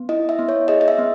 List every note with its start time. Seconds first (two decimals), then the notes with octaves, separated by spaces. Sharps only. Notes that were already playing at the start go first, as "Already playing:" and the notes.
Already playing: B3
0.09 E4 D#5
0.29 E5
0.39 B3
0.49 C#5
0.68 G#4 D#5
0.81 D#5
0.88 E5
0.99 B3